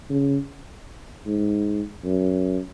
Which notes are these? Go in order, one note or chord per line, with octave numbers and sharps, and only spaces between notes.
C#3
G#2
F#2